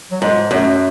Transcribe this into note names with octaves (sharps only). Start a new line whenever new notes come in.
F#3
G#2 G#3
F#2 A3